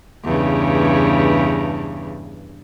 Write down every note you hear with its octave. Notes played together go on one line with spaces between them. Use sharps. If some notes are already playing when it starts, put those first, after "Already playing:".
E2 G2 C#3